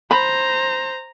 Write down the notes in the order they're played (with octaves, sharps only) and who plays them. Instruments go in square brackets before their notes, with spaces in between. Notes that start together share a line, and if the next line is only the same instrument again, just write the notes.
[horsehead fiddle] C5 [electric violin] A#5 [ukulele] B5